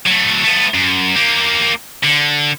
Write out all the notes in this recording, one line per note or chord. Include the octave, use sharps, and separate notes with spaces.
F#3 A3
A3 B3
F#2
A#3 G4
D3